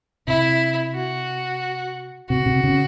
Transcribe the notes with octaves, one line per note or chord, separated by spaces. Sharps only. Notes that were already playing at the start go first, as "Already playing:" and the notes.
C3 E4
F#4
C3 F#4
C3
C#3